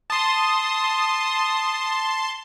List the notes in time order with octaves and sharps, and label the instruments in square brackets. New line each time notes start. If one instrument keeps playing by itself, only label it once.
[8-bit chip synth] A5 C6 [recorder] D#6